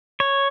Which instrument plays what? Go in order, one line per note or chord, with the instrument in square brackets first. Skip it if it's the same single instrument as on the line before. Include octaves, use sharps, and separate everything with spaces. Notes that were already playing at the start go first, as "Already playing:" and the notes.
[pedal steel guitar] C#5